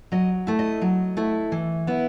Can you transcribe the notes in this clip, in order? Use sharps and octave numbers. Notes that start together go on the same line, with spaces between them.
F#3 D#5
A3 E4
D#5
F#3
A3 E4
E3
B3 E4